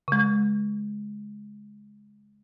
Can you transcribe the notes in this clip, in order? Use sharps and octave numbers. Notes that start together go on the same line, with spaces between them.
C#3 G#3